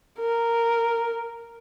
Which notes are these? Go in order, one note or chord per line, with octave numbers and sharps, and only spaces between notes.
A#4